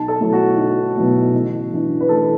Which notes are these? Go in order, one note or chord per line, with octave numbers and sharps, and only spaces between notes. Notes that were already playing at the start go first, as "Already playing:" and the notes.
Already playing: B1 A5
A4
B2 F#3 A3 E4
F#4
B1
B2 F#3 A3 E4
A1
A2 E3 D4
B4
A1 A4